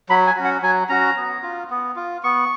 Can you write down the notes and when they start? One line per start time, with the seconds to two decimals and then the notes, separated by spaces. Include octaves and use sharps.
0.09 F#3 B5
0.27 G#5
0.37 C#4 F#4
0.44 F#5
0.62 F#3 G#5
0.89 C#4 F#4 A#5
1.16 B3
1.42 F4
1.70 B3
1.96 F4
2.23 B3 C#6